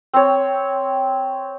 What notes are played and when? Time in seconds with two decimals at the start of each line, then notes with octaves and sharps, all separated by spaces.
0.13 C4 C#5